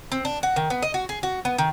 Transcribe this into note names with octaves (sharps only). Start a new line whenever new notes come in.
C4
D4
F#4
D#3
B3
D#5
F#4
G#4
F#4
B3
D#3